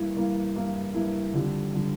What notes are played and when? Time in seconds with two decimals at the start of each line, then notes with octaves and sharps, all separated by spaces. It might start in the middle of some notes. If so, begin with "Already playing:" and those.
Already playing: G2 E3 A#3 E4
0.16 G2 E3 A#3 E4
0.56 G2 E3 A#3 E4
0.94 G2 E3 A#3 E4
1.34 F2 D3 G3
1.74 D3 G3